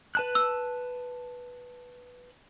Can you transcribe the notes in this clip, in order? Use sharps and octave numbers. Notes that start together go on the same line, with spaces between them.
B4 A5 F#6
E6